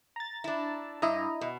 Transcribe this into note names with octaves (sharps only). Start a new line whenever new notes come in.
A#5 A6
D4 E4
G2 E4 D#5 A#5
B2